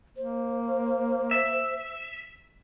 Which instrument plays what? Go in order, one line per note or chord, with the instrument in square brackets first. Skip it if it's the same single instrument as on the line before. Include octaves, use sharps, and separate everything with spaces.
[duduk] A#3 [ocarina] C5
[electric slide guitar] E5